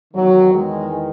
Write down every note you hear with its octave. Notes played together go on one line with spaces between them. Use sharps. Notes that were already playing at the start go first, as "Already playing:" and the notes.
E2 D#3 F#3
G#3